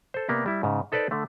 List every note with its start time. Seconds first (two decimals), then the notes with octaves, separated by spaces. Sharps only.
0.14 A4 C5
0.28 C3 A#3 B3 G4 D5
0.46 G3 E4
0.63 G#2 C#3
0.92 D#4 A4 B4 C5 D5
1.11 D3 A3